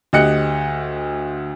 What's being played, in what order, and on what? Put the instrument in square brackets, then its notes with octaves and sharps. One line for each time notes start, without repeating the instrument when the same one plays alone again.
[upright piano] D2 G4 D#5 F#6 C#7